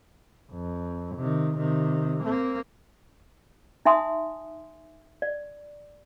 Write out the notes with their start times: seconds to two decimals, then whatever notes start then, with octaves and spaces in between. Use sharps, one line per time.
0.52 F2
1.15 C3 D#3
1.57 C3 D#3
2.23 A#3 C4
3.85 D#4 E5 G#5 C6 D#6
5.22 D5